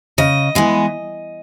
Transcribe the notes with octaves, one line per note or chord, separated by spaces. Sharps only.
C#3 D#5
E3 G#3 B3